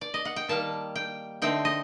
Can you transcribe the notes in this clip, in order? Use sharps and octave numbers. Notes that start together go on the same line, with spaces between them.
D5
D#5
F#5
G5
D#3 G3 A#3 A5
G5
D3 A3 C4 D#4 G5
D#5